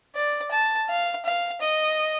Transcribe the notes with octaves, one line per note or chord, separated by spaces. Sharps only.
D5
A5
F5
F5
D#5